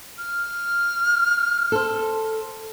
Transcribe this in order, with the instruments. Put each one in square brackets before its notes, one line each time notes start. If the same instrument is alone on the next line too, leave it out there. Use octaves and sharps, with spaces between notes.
[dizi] F6
[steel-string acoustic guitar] A4 C5